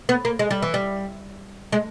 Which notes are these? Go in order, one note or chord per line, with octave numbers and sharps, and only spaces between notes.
B3
A#3
G#3
G3
E3
G3
G#3